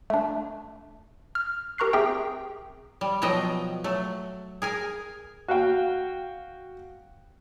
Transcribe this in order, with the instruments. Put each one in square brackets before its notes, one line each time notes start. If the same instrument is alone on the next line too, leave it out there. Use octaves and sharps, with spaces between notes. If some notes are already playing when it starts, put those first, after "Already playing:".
[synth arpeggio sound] A3 D4
F6
G4 A#4 A#5 C#6 F#6 C7
C4 G4 G#4 E5 G5 A#5
[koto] G3
B2 F3 F#3 D#5 G5
F#3 A3
G#4 A#4 G#5
[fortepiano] F#4 F5 G5